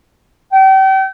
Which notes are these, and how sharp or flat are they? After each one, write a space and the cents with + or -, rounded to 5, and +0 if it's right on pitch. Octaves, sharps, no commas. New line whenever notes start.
G5 -35